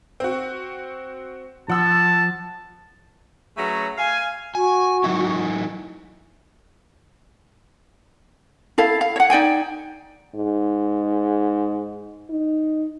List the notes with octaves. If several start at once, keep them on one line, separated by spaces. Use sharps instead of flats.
C4 F#4
F3 F#5 A5 E6
F#3 A3 C#4 G#4 B4 A#5
F5 G#5
F#4 G#5
F#3 D#4 E4
E4 A4 F5
F5
C#5 F#5
D#4 D5 G5 G#5
G#2
D#4